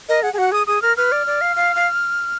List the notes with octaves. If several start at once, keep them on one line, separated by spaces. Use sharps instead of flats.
A#4 D#5
G#4 F#5
G#4 G#5
F#4 F#5
G#4 D#6
G#4 D#6
A#4 F6
B4 F6
D5
D5
F5
F5
F5